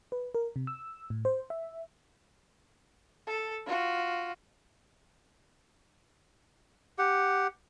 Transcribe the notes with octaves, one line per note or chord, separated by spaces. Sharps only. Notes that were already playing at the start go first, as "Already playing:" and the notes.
B4
A#4
C3
E6
A2
C5
E5
A4
F4 F#4
G4 F#5